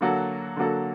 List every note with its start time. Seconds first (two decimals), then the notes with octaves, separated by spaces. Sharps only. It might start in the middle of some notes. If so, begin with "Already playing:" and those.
0.01 D3 F#3 A#3 F#4 A4
0.57 D3 F#3 A#3 F#4 A4